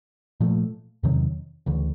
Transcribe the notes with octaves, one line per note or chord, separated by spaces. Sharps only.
A#2 F3 A3
E2 C3 D#3 F#3
D2 C#3 E3